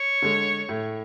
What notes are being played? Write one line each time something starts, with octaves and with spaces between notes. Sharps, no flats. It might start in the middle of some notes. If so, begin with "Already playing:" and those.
Already playing: C#5
D3 G#3
A2